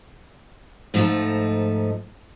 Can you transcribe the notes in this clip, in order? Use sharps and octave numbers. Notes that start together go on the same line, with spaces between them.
G#2 F3 A3 D#4